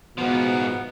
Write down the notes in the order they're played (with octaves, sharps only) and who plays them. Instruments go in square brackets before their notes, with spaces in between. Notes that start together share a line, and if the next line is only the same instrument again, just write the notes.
[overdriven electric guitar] G#2 F3 [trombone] B2 [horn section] B3